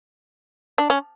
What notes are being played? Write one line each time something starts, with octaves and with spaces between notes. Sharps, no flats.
D4
C#4